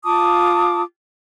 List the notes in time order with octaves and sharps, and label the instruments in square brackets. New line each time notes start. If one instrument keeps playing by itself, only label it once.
[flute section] F4 A5 D6 D#6